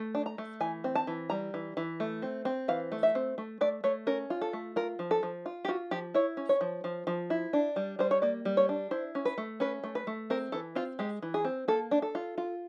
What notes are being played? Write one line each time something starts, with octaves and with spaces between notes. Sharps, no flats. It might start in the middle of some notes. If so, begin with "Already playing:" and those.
Already playing: A3
D4
A#5
A3
E3 G#5
C4
A5
E3
G3 A#5
E3
E3
A3
C4
C4
E3 F5
A3
E5
C4
A3
A3 D5
A3 C#5
C#4 A#4
F4
A4
A3
F4 A#4
F3
A4
F3
F4
G4
F4 F#4
F3 G4
E4 C#5
C#4
C#5
F3
F3
F3
E4
D4
G3
G3 C5
C#5
A#3 D5
G3
C#5
D4
E4 C5
C#4
B4
A3
C#4 B4
A3
B4
A3
C4 A#4
E3 A4
C4 F4
G#3 G4
E3
G#4
C4
A#3 A4
D4
A4
F4
F4